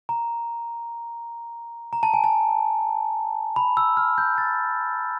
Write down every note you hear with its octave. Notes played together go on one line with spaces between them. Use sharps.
A#5
A#5
A5
G#5
A5
B5
E6
F6
G6
G6 A6